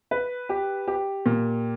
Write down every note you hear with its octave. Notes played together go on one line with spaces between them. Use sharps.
B4
G4
G4
A#2